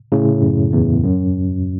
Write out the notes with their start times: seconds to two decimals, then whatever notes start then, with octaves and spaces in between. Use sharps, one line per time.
0.12 A2 C#3
0.42 F#2
0.73 E2
1.04 F#2